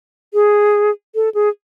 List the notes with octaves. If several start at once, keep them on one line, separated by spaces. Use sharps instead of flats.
G#4
A4
G#4